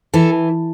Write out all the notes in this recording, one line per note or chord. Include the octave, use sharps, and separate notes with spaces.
E3 A4